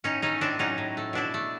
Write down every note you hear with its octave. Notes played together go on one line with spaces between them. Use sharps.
A2 C#4 D#4
A3 C#4 D#4
A2 C4 D4
F#3 C#4 D#4
A2
A3
B2 D4 E4
A3